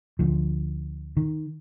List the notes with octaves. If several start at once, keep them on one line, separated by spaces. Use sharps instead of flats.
D2 F3
D#3